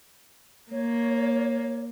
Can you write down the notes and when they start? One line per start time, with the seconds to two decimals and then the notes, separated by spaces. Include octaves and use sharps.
0.72 A#3 C#5